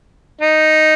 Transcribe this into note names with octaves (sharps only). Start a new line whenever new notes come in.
D#4